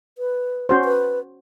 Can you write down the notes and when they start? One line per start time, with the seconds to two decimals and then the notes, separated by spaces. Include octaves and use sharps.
0.18 B4
0.69 C#4 F#4 C5
0.85 B4